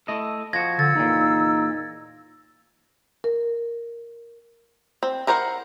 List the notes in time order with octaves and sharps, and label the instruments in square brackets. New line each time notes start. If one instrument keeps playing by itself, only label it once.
[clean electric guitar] A3 E4 D#5
[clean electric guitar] F3 F#4 [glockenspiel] G#6 A#6
[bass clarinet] D3 [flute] E6 [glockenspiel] A6
[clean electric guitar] E2 A#2 [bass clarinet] D#4
[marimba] A#4
[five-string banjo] C4
E4 A#4 C5 C#5 F#5